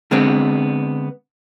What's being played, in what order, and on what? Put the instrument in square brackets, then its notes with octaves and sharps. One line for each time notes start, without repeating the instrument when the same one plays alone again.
[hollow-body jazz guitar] D3 G#3 B3 C4